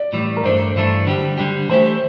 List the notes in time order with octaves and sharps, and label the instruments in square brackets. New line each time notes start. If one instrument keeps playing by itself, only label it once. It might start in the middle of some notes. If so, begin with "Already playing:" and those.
Already playing: [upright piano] D5
[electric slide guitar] A2 E3 G3
[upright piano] A#4
[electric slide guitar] G2 E3 A3 D4 [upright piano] C5
[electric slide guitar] G2 E3 A3 D4
D3 G3 D4 G4
D3 G3 D4 G4
[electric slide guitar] E3 A3 E4 G4 [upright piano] C5